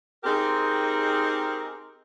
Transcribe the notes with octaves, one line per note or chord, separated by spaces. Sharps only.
C4 D#4 G4 G#4 A#4